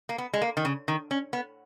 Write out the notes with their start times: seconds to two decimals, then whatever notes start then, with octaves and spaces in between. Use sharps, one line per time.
0.09 A#3
0.18 B3
0.33 G#3
0.42 A#3
0.57 D#3
0.65 C#3
0.88 D#3
1.11 C#4
1.33 B3